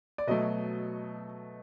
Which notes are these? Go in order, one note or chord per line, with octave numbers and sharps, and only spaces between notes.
D5
B2 F#3 A3 D#5